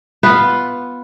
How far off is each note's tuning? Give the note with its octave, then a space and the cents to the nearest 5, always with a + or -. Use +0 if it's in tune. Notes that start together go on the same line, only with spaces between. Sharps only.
B3 +0 F4 +0 B4 +0